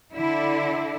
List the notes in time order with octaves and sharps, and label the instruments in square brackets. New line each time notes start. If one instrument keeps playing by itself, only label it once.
[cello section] D3 E4